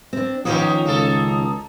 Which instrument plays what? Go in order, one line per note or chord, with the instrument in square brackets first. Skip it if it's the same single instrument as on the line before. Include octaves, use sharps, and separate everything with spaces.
[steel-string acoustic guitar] C4 D4
[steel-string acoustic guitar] D#3 C#4 C#5 [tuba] F3 [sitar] A#3 B3 G4 [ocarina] D#6
[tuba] C#2 [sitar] A#3 A4